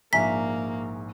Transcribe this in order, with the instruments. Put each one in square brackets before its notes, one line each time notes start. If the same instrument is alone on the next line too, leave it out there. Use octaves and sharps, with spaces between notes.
[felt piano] A#1 G#2 [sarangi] A#3 [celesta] E5 G#5 A#5 [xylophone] B6